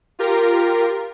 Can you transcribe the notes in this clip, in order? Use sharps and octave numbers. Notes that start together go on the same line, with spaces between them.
F4 G4 A#4